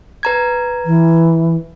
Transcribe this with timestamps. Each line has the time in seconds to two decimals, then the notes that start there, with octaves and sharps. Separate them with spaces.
0.23 B4 A#5 G#6
0.85 E3